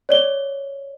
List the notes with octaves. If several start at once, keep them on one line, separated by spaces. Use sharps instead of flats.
C#5 D5 G7